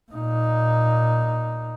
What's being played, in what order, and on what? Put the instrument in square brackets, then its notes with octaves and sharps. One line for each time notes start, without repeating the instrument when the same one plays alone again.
[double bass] A#2 D#4